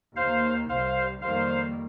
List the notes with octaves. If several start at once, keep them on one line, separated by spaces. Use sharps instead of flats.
D#2 D#3 A#3 C5 F5
C2 C3 G3 C5 F5
F2 D#3 G3 A#3 C5 F5